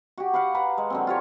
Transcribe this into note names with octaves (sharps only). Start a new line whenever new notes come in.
F#4 G4
B4 F5 F#5
B4 A#5
G#3
D3 F#3 C4
F4 G4 C#5